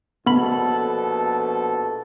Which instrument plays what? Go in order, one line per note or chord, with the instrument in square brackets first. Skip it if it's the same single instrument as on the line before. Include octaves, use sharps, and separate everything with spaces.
[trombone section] A#1 B2 A4 [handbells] B3 B5